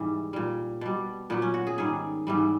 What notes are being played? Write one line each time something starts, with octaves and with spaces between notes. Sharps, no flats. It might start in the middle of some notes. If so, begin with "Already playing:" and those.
Already playing: G#2 C3 E3 G3
A#2 G3
B2 G3
A#2 F#3 B3
C#4
F#4
G#4
G#2 D#3 G3 G#4
G#2 E3 G3